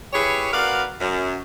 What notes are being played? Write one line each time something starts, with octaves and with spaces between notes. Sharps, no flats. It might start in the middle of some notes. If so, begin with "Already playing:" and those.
E4 G4 G#4 B4 C#5
C4 F#4 A#4 B4 D5 F5
F#2